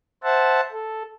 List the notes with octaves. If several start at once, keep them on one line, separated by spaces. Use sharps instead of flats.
C5 E5 F#5 A5
A4